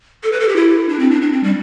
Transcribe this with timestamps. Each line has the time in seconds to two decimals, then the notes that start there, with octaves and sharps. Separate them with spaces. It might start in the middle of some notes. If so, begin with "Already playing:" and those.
0.23 A4
0.32 B4
0.40 A4
0.49 G4
0.56 E4
0.89 D4
0.99 C4
1.11 D4
1.22 D4
1.32 C4
1.43 G3